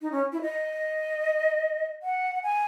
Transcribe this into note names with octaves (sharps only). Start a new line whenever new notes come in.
D#4
C#4
E4
D#5
F#5
G#5